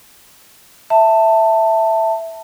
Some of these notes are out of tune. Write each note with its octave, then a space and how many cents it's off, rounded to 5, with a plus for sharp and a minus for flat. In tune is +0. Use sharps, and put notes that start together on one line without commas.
E5 +0 A5 +15